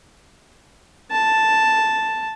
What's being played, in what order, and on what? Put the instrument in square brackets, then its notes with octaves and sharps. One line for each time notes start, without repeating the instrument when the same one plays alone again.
[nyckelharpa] A5